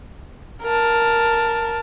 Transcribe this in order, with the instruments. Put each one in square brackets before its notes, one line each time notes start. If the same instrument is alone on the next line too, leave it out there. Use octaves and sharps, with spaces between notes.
[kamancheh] A#4 A5